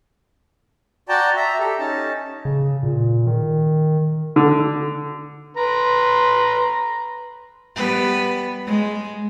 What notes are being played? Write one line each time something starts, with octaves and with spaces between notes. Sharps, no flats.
F#4 D5 G5 A5 A#5
E5 A#5
G4 A4
C#4 D#4 A5
C#3
A#2
D#3
D3
B4 A#5 C6
G3 B3 B4
G#3